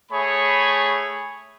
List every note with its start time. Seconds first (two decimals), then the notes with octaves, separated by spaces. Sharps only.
0.12 A3 G#4 C#5 B5